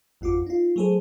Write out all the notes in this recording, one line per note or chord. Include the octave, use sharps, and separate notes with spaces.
G#1 F2 F4 F#4 D6
D#4 F4
F#3 A3 G#4 A4 C5